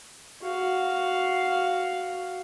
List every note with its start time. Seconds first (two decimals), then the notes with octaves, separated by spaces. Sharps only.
0.42 F#4 F5